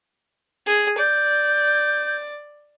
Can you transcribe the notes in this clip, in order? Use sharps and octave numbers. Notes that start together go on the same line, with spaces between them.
G#4
D5 G6